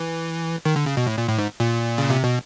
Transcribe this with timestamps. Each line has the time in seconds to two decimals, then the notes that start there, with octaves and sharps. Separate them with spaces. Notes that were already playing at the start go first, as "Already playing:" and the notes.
Already playing: E3
0.65 D#3
0.76 D3
0.86 C#3
0.97 B2
1.07 A2
1.18 A#2
1.28 A2
1.38 G#2
1.60 A#2
1.98 C#3
2.10 C3
2.24 B2